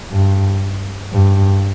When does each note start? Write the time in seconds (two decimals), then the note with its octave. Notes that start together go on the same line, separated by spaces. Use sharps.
0.11 G2
1.12 G2